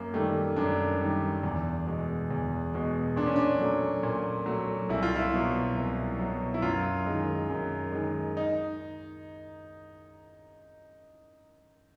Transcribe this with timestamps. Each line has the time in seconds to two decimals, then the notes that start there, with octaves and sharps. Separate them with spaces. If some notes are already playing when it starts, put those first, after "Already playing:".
Already playing: F#2 A#3
0.14 D#3 G3 A3
0.56 F#2 D4
1.01 D#3 G3
1.43 E2
1.86 B2 G#3
2.31 E2
2.74 B2 G#3
3.16 A#2 D4
3.26 C#4
3.36 D4
3.59 F#3 A3
4.03 A#2
4.46 F#3 A3
4.89 C2 E4
5.03 F4
5.16 E4
5.34 B2 F#3
5.77 C2
6.19 B2 F#3
6.54 E4
6.62 F#2 F4
7.06 D#3 G#3
7.50 F#2
7.92 D#3 G#3
8.37 D#4